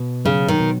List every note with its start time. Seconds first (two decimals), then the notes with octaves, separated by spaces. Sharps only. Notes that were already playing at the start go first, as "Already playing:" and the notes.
Already playing: B2
0.25 C#3 F#3
0.48 D#3
0.60 B2